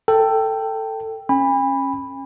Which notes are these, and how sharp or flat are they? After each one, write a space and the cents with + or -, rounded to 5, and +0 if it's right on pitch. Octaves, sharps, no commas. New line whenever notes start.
A4 +15 G5 +0
C#4 -25 G#5 -45 B5 -5